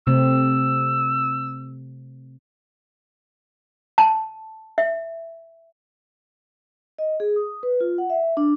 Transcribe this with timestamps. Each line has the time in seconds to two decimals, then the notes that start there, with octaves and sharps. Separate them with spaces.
0.07 C3 A3 C4 E6
3.98 A5
4.78 E5
6.99 D#5
7.20 G#4
7.36 D#6
7.63 B4
7.81 F4
7.98 F#5
8.10 E5
8.37 D4